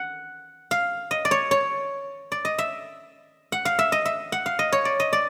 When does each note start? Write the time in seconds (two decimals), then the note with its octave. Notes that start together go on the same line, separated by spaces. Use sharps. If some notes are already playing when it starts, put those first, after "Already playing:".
Already playing: F#5
0.71 F5
1.11 D#5
1.25 D5
1.31 C#5
1.51 C#5
2.32 D5
2.45 D#5
2.58 E5
3.52 F#5
3.65 F5
3.79 E5
3.92 D#5
4.05 E5
4.32 F#5
4.46 F5
4.59 D#5
4.72 C#5
4.85 D5
5.00 D#5
5.13 D5